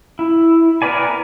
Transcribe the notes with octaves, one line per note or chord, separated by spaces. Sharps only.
E4
B3 A#4 B4 D5 G#5